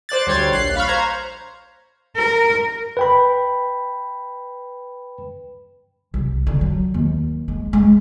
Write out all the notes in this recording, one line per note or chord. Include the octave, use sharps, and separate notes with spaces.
C5 D5 F#6 A6
D2 G3 C#5 C6 G#6 A6
A#1 F#6 C7
F5 B5 C#6 F6
C5 A#5 G#6
A#4
B4 G5 B5
C2
D3
F#3
D#2
G#3
G#3